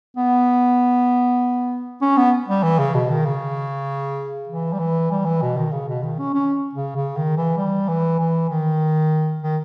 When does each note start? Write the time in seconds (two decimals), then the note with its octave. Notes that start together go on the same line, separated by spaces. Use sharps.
0.17 B3
2.02 C#4
2.17 B3
2.48 G3
2.64 E3
2.79 C#3
2.94 B2
3.10 D#3
3.25 C#3
4.49 E3
4.73 G3
4.80 E3
5.11 G3
5.25 E3
5.42 B2
5.57 D#3
5.72 C#3
5.88 B2
6.03 D#3
6.19 C#4
6.34 C#4
6.75 C#3
6.96 C#3
7.17 D#3
7.37 E3
7.58 G3
7.89 E3
8.19 E3
8.50 D#3
9.43 D#3